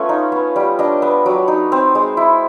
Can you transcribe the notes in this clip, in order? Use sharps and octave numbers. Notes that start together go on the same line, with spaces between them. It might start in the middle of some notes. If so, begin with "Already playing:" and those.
Already playing: A3 B3 C#4 F4 F#5 G#5
D#4
B3
G3
D4 D#5
B3
F#3
D#4
C4
G#3
E4